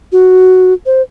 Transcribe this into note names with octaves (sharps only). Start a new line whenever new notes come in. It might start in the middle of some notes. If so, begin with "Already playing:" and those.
F#4
C5